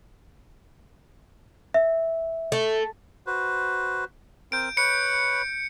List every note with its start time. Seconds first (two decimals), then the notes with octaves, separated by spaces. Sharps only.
1.74 E5
2.52 A3
3.27 F#4 B4 C5
4.52 C4 A#4 G6 D7
4.77 B4 C#5 B5 C#7